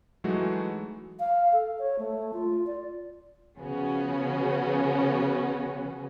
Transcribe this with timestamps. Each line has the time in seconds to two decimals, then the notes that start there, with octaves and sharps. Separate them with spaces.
0.24 E3 F#3 G#3 A3 D#4 F#4
1.19 F5
1.53 A4
1.79 C#5
1.99 A3
2.33 F4
2.67 D5
3.58 C#3 F3 B3 C#4 F#4